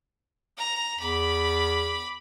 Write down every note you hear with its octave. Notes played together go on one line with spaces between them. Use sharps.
A#5
E2 B5 D6